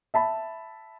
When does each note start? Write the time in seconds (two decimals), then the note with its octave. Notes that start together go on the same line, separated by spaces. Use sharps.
0.14 E5 A5 B5